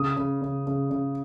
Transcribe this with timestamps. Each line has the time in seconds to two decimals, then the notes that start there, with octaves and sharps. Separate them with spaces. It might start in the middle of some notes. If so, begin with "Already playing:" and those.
Already playing: C#3 D#6
0.17 C#3
0.42 C#3
0.67 C#3
0.90 C#3